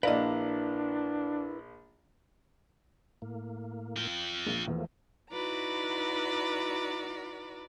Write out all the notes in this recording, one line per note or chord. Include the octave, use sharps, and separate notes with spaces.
A#1 D4 E4 A#4 B4 D5 D#5 F5
A2 A#3
F4 G5
A#1 A#3
E2 F3 A3 A#3
D#4 E4 F#4 B4 D5 A#5